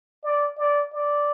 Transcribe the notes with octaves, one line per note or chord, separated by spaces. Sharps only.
D5
D5
D5